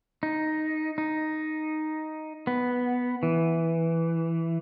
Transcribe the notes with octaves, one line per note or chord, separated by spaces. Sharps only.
D#4
D#4
B3
E3